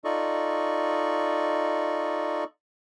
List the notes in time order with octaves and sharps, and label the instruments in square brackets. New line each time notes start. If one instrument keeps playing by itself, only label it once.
[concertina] D#4 F4 A4 D5 D#5 C#6